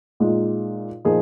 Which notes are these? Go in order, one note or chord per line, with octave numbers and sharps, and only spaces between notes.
A#2 G#3 D#4
A#2 F3 A#3 D#4 G#4